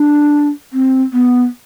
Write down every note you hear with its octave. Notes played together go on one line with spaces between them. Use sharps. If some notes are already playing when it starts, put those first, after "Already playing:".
Already playing: D4
C4
B3